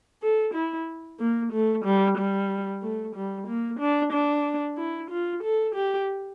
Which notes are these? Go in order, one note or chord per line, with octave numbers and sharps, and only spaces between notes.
A4
E4
A#3
A3
G3
G3
A3
G3
A#3
D4
D4
E4
F4
A4
G4